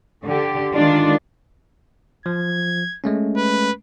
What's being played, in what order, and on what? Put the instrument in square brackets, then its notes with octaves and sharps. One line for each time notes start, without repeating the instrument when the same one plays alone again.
[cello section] D3 G4
D#3 G#3 D4 F4
[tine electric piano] F3 [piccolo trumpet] G#6
[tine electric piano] G#3 A3 C#4
[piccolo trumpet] B4